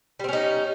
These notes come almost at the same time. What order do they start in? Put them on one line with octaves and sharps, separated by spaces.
G3 C4 C#4 D#4